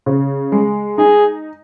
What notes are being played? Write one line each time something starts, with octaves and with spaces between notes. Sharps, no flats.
C#3
G#3
D#4 G#4